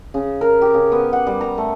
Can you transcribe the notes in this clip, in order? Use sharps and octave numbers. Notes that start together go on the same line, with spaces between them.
C#3
A#4
G4
C#3
B3
F#5
G3
A#5
A3